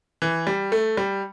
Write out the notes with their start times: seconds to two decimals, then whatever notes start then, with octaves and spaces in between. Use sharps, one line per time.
0.22 E3
0.47 G3
0.72 A3
0.97 G3